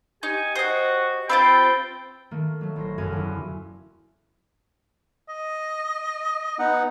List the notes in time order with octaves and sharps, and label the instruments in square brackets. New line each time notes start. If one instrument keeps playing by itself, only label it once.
[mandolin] D#4 [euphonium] G4 [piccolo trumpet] G#5
[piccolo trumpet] F#4 [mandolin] C5 D#5
[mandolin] C4 F4 C5 [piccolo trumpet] G5 [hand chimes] B5 A6
[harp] D#3 A3 A#3
F#3 A3
A1 C5 A#6
E1 F#2 C#3 A#3 G#5
D3 C4 E4
[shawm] D#5
[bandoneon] B3 D#4 F#5